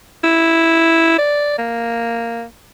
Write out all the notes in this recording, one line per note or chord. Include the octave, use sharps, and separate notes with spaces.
E4
D5
A#3